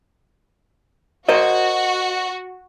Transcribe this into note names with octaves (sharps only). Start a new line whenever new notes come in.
F#4 A#4 C5 D#5